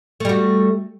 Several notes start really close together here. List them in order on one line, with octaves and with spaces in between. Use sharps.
A3 G3 F#4